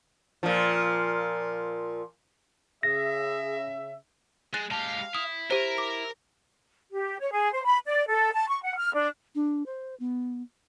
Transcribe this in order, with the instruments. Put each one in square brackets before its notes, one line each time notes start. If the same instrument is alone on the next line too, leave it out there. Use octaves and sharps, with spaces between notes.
[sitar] A#2 F3
[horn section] C#3 E5 [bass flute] G#4 [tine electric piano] A#6
[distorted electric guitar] G#3 [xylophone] F#6 A6
[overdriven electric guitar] G#3 G4 [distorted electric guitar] F5 [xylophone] A5
[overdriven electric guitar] E4 [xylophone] D#6
[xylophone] G4 C5 [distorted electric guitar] A#4
[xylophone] D6
[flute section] G4
C#5
G#4
C5
B5
D5
A4
A5
C#6
F#5
F6
D4
[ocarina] D4
C5
B3